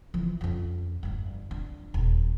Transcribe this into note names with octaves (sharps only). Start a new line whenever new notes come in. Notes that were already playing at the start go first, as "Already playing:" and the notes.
E3 F3
F2 C#4
G1 G2
D4
D#1